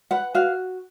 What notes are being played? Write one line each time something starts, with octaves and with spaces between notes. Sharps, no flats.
B4 F#5
F#4 F5